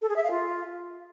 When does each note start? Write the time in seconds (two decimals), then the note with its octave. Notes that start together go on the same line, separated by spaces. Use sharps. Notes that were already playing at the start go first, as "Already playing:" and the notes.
0.02 A4
0.09 G#4
0.16 E5
0.23 F5
0.31 F4